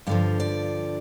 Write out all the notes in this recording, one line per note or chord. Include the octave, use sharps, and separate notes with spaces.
G2 D3 F3 F5
D5